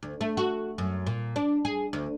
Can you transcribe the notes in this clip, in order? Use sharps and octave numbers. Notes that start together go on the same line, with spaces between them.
D2
A3
F#4
F#2
A#2
D4
G#4
D2